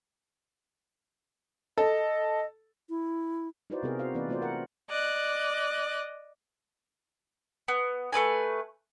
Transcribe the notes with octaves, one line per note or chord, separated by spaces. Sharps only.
A4 D#5
E4
D#4 E4 F#4 B4 C5 D5
C3 B3 C4 G4 G#4 A#4
F#4 C5 F5
E3 A#3 C4 D#4 B4 D5
A3 C4 F4 F#4 C5 D5
A#4 F#5
D5 D#5 F#6
B3
A3 C4 B4 G#5